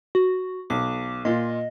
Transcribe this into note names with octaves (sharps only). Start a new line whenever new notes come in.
F#4
B1 D6
A#2 F4 D#5